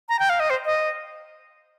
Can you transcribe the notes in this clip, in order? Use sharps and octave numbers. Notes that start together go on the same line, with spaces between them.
A#5
G5
F5
D#5
C5
D#5